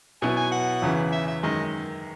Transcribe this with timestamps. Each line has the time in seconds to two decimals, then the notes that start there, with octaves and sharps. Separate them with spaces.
0.22 B2 F#3 B3 E4 G#5
0.37 G#5
0.52 F#5
0.82 E2 C#3 E3
1.12 E5
1.28 E5
1.43 F#2 D#3 G#3 D#5